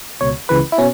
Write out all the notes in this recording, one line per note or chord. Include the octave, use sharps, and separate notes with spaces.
C#2 B2 C#5
C#2 C#3 E3 B4
E4
B2 C#4